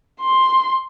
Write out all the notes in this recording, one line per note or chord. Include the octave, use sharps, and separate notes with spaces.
C6